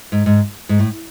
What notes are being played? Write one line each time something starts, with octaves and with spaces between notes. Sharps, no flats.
G#2
G#2
G#2
A2